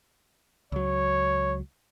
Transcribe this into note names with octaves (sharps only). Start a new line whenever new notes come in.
C#2 F#3 C#5